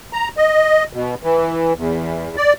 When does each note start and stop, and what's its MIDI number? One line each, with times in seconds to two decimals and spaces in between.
0.13 0.28 82
0.37 0.84 75
0.93 1.15 47
1.23 1.73 52
1.76 2.36 40
2.37 2.53 74